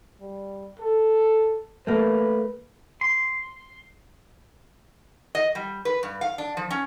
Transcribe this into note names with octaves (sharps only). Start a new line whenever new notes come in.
G3
A4
A3 A#3 B4
C6
D#5
G3
B4
G2
F5
D4
F3
C#4